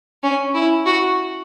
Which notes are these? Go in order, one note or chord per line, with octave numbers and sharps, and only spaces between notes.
C#4
E4
F#4